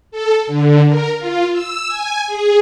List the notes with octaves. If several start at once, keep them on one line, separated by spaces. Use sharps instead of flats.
A4
D3
A#4
F4
E6
G#5
G#4